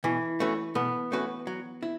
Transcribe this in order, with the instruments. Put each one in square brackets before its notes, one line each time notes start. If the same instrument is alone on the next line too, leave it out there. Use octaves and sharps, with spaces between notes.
[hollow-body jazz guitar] B2 [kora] E3
[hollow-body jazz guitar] A3 C#4 F#4 B4
[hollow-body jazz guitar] B2 [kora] B3
[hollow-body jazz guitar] A3 C#4 F#4 B4
F#3
E4